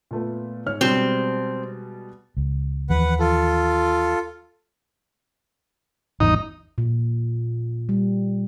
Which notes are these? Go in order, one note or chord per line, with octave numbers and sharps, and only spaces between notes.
A#2 A3 B3
G#2 C#5 F6
B2 G3 G#3 C4
C#2
D#2 E3 F3 B4 F#5
F4 A4
G#1 E2 G2 D#4
A#2
G3